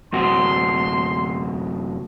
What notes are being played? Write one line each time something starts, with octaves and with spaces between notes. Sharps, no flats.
F#2 C3 F#4 C6